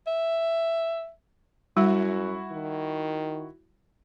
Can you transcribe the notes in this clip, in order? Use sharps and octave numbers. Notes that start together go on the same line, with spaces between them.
E5
F#2 G3 E4 F#4
D#3